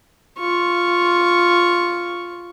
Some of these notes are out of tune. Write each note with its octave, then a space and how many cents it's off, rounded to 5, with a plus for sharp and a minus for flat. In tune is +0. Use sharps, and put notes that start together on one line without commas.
F4 +0 C#6 +0